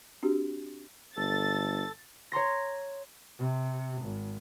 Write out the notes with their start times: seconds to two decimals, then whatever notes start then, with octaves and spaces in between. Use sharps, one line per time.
0.23 C4 D4 F#4 G4
1.16 G1 A4 A6
2.32 C#5 A#5 C6 A#6
3.39 C3
4.02 G#1